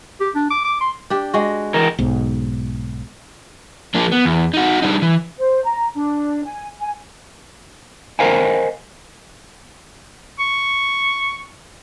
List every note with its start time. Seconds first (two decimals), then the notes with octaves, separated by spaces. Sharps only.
0.20 G4
0.35 D4
0.50 D6
0.65 D6
0.81 C6
1.10 D4 G4
1.34 G#3 F#4
1.74 E3 A#4
1.99 B1 G#2
3.95 F3 A#3 D4
4.12 B3
4.25 E2
4.54 D#4 F#4
4.82 G3 D4 D#4
5.02 E3
5.38 C5
5.64 A#5
5.95 D4
6.45 G#5
6.81 G#5
8.19 A#4 C5 D#5 F5 G5 G#5
10.40 C#6